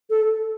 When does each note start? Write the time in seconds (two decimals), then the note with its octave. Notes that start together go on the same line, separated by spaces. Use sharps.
0.10 A4